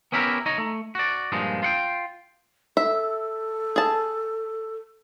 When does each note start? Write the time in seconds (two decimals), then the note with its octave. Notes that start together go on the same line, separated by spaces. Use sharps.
0.12 B3 C#4 E4 G4 A#4
0.46 D#4 C#5 D#5
0.58 A3
0.95 F#4 D5
1.32 G2 A#2 F3 G#3 D#4
1.63 F4 F#5 G5
2.77 A4 E5
3.76 G#4 A5